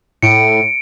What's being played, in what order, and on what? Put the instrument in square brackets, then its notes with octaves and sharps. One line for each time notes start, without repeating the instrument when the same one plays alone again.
[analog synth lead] A2 [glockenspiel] C#7 D7